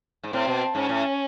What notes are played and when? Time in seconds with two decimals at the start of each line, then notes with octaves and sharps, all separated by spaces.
0.23 G#2
0.32 A2 C4
0.47 B2
0.75 G#2 C#4
0.89 A2